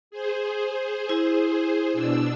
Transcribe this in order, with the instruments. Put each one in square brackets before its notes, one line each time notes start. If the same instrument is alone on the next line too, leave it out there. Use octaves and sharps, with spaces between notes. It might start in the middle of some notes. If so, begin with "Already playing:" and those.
[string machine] G#4 C5
[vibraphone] E4
[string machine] B2 D4 E6